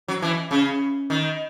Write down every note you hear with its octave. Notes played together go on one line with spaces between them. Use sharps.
F#3
E3
C#3
D#3